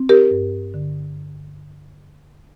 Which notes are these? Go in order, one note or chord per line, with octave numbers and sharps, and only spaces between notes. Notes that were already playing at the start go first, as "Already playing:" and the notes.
Already playing: C4
G4 A#4
G2
D3